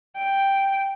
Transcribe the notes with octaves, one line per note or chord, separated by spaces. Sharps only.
G5